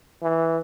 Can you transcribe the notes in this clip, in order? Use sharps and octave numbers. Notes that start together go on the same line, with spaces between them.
E3